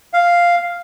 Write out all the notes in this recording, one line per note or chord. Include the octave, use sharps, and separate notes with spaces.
F5